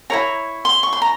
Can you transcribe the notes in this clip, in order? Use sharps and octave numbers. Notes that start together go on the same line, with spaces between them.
E4 A#4 C#5 A#5
C6
C#6
C6
A#5